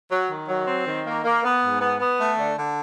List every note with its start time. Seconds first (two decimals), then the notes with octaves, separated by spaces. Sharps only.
0.10 F#3
0.29 D#3
0.48 F#3
0.67 C4
0.86 D#3
1.05 A#3
1.24 A#3
1.43 B3
1.62 G#2
1.81 B3
2.00 B3
2.19 A3
2.38 D3
2.57 D3